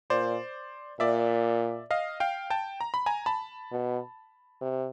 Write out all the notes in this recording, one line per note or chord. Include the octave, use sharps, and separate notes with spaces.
A#2 C5 D5
A#2 D5 E5
D#5 F5
F5 G5
G5 A5
A#5
B5
G#5 A#5
A5 B5
B2
C3